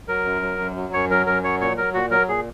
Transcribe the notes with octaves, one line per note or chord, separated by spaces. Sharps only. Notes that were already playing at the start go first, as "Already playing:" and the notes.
F#3 A#4
F#2
F#3
F#2
F#3
F#2 C#5
F#3 A#4
F#2 A#4
F#3 C#5
A#2 C#5
F#3 A#4
A#2 F#4
F#3 A#4
A#2 G#4